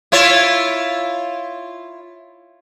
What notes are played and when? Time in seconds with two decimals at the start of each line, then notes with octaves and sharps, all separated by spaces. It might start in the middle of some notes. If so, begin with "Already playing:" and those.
0.12 E4 F4 C#5